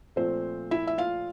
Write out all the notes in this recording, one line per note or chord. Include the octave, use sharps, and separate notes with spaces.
A#2 F3 A3 C4 C5
E4 E5
E5
F4 F5